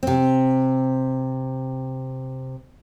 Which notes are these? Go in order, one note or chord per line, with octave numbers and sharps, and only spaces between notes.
C3 C4